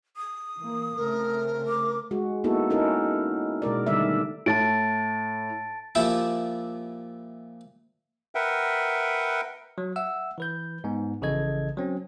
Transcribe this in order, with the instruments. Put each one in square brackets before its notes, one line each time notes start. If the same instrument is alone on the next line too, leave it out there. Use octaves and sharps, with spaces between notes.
[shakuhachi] D#6
[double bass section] E3 A#3
[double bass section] C#3 A3 C4 [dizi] A#4
[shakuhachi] D6
[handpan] G#3 F#4
A#3 B3 D#4 E4 F#4 A4
C#4 D#4 E4 A4 A#4
B2 G#3 A#4 D5
D3 D#3 G3 A3 D5 E5
[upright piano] A2 [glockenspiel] A5 A6 D7
[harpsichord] A#2 F3 E4 G4 D5 E5
[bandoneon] A#4 B4 E5 F#5 G5
[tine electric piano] F#3
E5 F#5 E6
E3 B4 G6
G#2 B3
A#1 C#3 E3 A4 D#5 G#6
F#3 C4 C#4